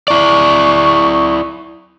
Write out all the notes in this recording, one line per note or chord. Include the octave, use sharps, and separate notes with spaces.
E4 D5 C#6